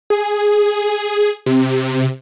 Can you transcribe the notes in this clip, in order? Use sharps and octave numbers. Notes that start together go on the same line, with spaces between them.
G#4
C3